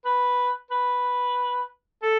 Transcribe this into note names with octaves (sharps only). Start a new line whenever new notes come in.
B4
B4
A4